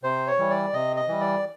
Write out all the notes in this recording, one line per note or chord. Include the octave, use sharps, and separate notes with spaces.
C3 C5
C#5
E3 G3
D5
C3 D#5
D#5
E3 G3
D5